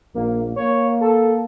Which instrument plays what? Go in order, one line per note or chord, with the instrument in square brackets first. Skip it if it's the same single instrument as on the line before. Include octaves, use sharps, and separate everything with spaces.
[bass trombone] A#1 [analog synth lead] A#3
[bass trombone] A#3 [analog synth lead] C#5
[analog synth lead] A4